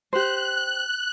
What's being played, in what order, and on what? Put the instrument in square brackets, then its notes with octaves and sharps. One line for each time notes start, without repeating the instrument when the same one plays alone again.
[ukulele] G4 C5 [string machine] F#6